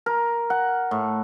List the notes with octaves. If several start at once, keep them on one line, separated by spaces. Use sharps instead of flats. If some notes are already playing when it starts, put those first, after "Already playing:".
A#4
F#5
A2